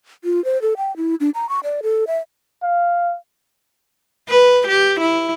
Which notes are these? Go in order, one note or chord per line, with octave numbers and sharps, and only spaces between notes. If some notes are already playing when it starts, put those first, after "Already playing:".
F4
C5
A4
G5
E4
D4
A#5
C#6
D5
A4
E5
F5
B4
G4
E4